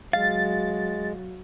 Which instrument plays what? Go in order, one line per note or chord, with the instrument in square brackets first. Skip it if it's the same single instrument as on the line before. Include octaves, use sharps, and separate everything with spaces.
[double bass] F#3 [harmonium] G#3 [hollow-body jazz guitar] F5 [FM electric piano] A6